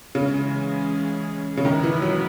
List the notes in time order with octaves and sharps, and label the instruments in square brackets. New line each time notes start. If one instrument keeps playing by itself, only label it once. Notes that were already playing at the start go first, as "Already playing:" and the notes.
[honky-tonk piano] C#3 [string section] E3 G#3 C#4 G#4
[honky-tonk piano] C#3
[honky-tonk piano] D#3 [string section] G#3 B3 E4 A#4
[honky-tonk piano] E3
F#3